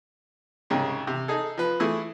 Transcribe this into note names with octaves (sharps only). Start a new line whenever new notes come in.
C2 G#2 C#3 C#6
C3
D#4 G#4 A4
F3 B4
E3 A3 E4 G#4